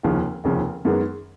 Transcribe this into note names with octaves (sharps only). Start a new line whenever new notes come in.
F1 D#2 C#3 F3
F1 D#2 C#3 F3
F#2 D#3 G#3 B3